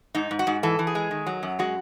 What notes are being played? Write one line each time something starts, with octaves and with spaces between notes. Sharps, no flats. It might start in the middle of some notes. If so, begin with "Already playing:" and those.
G#2 D#4
G#2
F#4
G#2
E3 A4
E3
G#4
G#3
D#3
F#3
F#2
G#3 F#4